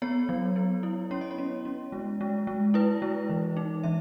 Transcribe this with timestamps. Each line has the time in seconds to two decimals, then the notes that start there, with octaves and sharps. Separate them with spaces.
0.02 B3 C#5
0.29 F#3
0.56 B3
0.83 E4
1.11 C#4 C#5
1.21 D#5
1.31 C#5
1.38 C#4
1.65 C#4
1.92 G#3
2.21 G#3
2.47 G#3
2.74 E4 B4
3.02 G#3
3.29 E3
3.57 D#4
3.83 E3 E5